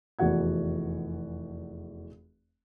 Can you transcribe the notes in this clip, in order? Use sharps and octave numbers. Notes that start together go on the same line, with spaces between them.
F1 E2 E3 F#4 F#5 G#6